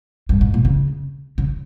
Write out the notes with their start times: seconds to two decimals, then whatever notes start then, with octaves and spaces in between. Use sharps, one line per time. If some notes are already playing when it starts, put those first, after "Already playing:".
0.29 G2
0.41 G#2
0.54 A#2
0.65 C#3
1.38 C#3